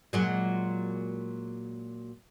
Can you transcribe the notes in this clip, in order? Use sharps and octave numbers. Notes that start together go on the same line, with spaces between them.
A#2 F#3 G#3